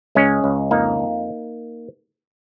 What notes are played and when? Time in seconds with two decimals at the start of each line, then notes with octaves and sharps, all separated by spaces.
0.15 C#2 G#3 C#4
0.44 C#2
0.71 F2 A#3 D#4
0.99 F2